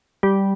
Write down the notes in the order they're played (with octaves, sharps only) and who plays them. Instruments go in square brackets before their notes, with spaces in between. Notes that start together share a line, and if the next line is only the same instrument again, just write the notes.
[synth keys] G3